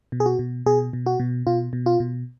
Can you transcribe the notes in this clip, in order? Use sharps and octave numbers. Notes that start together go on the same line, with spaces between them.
B2
G#4
F#4
B2
B2 G#4
B2
F#4
B2
B2 F4
B2
F4
B2